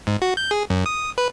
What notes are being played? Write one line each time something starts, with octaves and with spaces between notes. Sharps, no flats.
G#2
F#4
G6
G#4
F#2
D#6
B4